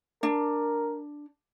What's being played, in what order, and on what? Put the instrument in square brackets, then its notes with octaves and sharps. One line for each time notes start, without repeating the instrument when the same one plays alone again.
[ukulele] D4 [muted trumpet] A#4